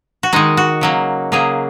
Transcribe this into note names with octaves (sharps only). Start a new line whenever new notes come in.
F#4
D#3 G#3 D#4
F#4
C#3 F#3 A#3
C#3 F#3 A#3 G#4